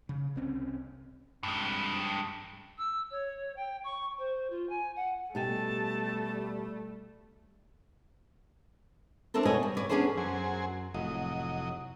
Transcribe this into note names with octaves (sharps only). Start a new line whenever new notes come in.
C#3
C2 C4 C#4
G2 G#3
E6
C#5
G5
C#6
C5
F4
G#5
F#5
B2 G3 A3 G4 G#5 A5
C4 D4 E4 A4 A#4
B2 B4 C#5 D#5 G#5
G3
B4 C#5 D5
B3 C#4 D4 G#4 A4 C5
F#2 F#3 G#4 C5
F1 A2 F#3 D#5